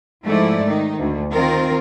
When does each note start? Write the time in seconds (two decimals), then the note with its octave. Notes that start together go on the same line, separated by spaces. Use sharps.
0.24 G#2 F3 A3 E4 D5
0.67 D#3 D#4
0.99 D2
1.32 D#3 C4 F4 A#4